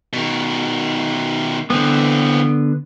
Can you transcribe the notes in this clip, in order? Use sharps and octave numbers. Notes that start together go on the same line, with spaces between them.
B2 D#3
D3 E3 B3 C4